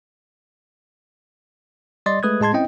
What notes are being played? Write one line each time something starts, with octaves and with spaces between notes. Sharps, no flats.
G3 D5 D#5 C6 A6
G#3 A3 B4 D#6 F#6 G#6
A2 G#3 A5 C6 G#6
C4 C#4 E4 D#5 G5